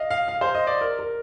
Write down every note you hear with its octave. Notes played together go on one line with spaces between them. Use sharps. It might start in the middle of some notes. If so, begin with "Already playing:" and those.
Already playing: D#5 F5
F5
F5
C5
D#5
D5
A#4
A#4